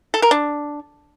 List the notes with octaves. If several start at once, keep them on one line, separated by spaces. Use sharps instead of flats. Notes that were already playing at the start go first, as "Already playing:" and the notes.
A4
A#4
D4